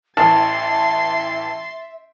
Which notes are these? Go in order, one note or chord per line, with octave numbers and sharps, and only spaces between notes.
A1 E3 E5 A5 C6 A6